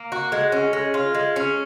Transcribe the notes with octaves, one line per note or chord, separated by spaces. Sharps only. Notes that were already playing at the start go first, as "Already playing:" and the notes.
Already playing: A#3
F#4
G#3
C#4
G#3
F4
G#3
C#4